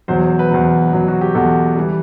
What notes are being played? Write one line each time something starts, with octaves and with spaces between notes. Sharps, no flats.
E2 B2 F#3 C5
C5
C5
B4
E2 B2 F#3
E2 B2 F#3
F#4
G4
E2 B2 F#3 A4
E3 G3